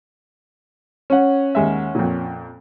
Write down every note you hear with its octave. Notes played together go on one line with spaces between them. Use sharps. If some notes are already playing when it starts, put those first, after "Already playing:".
C#4 F#5
D#2 G#3 E5
F2 A#2